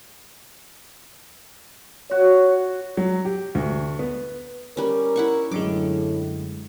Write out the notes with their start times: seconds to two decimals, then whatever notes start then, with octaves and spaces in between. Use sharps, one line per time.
2.11 F#4 C#5
2.97 F#3
3.25 G4
3.55 D2
3.99 B3
4.77 G3 C#4 A#4
5.16 E4 F#5 C#6
5.52 F#2 A2 D3 G#3 D6